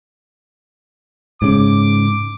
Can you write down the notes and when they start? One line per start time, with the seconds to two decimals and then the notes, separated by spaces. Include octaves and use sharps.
1.42 G#2 C#3 D6